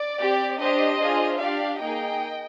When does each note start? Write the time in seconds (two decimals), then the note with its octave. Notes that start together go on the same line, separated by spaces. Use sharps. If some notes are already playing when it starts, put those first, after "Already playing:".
Already playing: D5
0.21 C4 G4
0.61 D4 G4 C5 D#5
1.01 D4 F4 G#4
1.40 D4 G4 D5 F5
1.80 A#3 D#4 G#4 D#5 G5